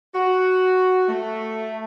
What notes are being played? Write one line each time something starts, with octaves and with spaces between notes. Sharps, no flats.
F#4
A3